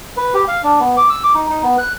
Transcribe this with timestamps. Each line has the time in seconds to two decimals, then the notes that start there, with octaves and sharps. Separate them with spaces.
0.17 B4
0.34 G4
0.48 F5
0.64 D4
0.80 B3
0.97 D6
1.09 E6
1.23 D6
1.35 D#4
1.49 D#4
1.63 B3
1.78 F#6